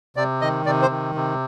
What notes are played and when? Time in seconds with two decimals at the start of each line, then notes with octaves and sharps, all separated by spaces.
0.16 C3 D5
0.41 D#3 D#5
0.66 C3 D5
0.82 C5
0.90 D#3
1.15 C3